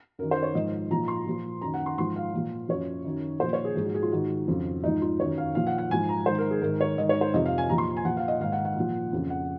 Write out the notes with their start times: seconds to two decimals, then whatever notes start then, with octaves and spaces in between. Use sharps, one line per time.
0.19 F#2 A#4
0.23 D#3
0.31 C5
0.43 C#5
0.54 G#2 F3 D#5
0.90 A#2 F3 A#5
1.08 C6
1.26 A#2 F3
1.61 F#2 D#3 A#5
1.74 F#5
1.86 C6
1.97 G#2 F3 C6
2.16 F5
2.33 A#2 F3
2.69 F#2 F3 C#5
3.05 F#2 D#3
3.40 A#2 C5
3.44 F3
3.53 C#5
3.65 G#4
3.76 G#2 F3 G#4
3.85 F#4
3.94 G#4
4.03 F4
4.12 G#2 D#3 F#4
4.48 F2 C#3 F3
4.84 G#2 F3 D#4
5.02 F4
5.20 F#2 D#3 C#5
5.38 F5
5.55 A#2 F3 F5
5.67 F#5
5.78 F#5
5.90 G#2 F3 G#5
6.09 A#5
6.26 G#2 D#3 C5
6.38 A#4
6.51 G#4
6.62 G#2 D#3 A#4
6.81 C#5
6.97 G#2 D#3 D#5
7.09 C#5
7.21 C5
7.34 F2 C3 F3 D#5
7.46 F5
7.58 G#5
7.69 A#2 A#5
7.72 F3
7.78 C6
7.97 G#5
8.05 A#2 F3 F#5
8.17 F5
8.28 D#5
8.40 G#2 D#3 F5
8.52 F#5
8.65 F#5
8.76 A#2 F3
9.13 F2 C#3 F3
9.30 F#5